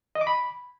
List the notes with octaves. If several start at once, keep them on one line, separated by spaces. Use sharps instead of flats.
D#5
D6
B5